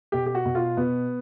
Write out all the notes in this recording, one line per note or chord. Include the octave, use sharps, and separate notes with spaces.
B2 G4
G4
F#4
B2
F4
B2 B3